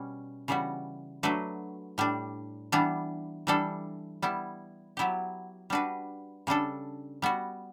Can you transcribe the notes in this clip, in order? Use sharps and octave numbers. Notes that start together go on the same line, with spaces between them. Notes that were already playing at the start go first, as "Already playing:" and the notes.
Already playing: B2 G3 C#4
C#3 E3 G3 B3 F#4
F#3 A3 D4 F#4 B4
A2 G3 D4
E3 G3 B3 D4
E3 G3 D4 A4
G3 B3 E4
F#3 B3 E4 G4
G3 D4 F#4 B4
C#3 G3 D4 A4
G3 B3 F#4